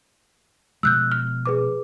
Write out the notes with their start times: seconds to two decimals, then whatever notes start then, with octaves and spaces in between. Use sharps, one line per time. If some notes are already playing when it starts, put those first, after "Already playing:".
0.83 B2 F3 G#3 E6 F#6 G6
1.12 F6
1.46 G#4 B4 D6